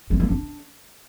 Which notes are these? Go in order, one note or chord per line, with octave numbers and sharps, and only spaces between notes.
G#3
A#3
D4